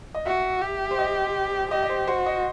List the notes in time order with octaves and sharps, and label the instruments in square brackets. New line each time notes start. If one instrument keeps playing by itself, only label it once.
[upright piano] D#5
[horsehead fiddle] F#4 [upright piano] E5
[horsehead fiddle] G4
[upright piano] C5
D#5
[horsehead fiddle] G4 [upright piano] D#5
[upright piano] D#5
C5
[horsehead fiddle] F#4 [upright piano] C5
[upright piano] D#5